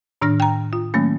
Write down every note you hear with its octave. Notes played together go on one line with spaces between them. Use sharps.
A2 D#3 D4 F6 A#6
G5 A#5
F4
D#3 F#3 A3 A#3 C#4